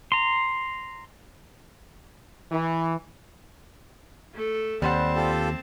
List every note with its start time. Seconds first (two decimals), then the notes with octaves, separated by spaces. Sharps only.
0.12 A#5 C6
2.51 E3
4.34 A3 A4
4.82 D#2 G3 C4 C5 F#5 A5
5.16 F4 G4 A4